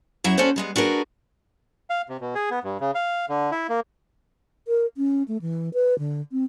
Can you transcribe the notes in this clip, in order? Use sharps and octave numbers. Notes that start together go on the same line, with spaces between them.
F#2 F#3 E4 E5
C#4 F#4 A4 C5 D5
G3 G#3 B3
D4 F#4 G#4 A#4 B4
F5
C3
B2
G#4
B3
G2
C#3
F5
D3
E4
A#3
A#4
C#4
A3
E3
B4
D3
C4